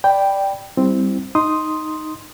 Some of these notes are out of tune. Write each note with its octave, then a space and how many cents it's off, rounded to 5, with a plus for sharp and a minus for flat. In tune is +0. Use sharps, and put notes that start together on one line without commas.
D5 +0 G5 +0 B5 +0
G3 +0 C4 +0 E4 +0
D#4 +0 C6 +0 D#6 +0